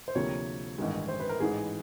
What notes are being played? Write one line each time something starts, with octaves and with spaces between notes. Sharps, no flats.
C5
D2 C3 F3 A#3 C#5
A1 G2 D#3 G#3
C5
B4
A#4
A1 G#2 E3 G#3 G#4